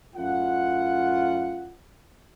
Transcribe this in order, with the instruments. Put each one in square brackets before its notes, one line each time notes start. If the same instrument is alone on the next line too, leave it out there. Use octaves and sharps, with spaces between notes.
[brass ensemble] F#2 A2 F4 F#5